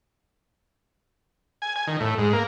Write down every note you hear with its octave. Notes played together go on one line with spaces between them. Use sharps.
G#5
G#5
D#3
A2
G#2
A#3